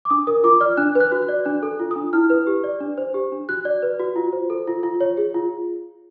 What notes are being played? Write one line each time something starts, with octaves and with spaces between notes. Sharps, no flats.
D6
D4 D#6
A#4 D#6
F4 D6
D5 F6
D4 F#6
B4
F#6
F#4
F#6
D5
D4 F#6
A4
F4
D4 D#6
E4 F6
B4
G4
D5
D4
C5
G4
D4
F#4 F#6
D5
B4
F#4
F4
C5
A4
F4
F4
C#5
G#4
F4